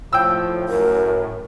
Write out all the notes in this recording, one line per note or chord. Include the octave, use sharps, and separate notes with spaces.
A2 F3 G5 E6
F#2 A#4